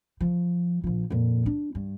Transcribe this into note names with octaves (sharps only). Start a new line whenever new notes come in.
F3
A#1 F3
F2 A#2
D4
G2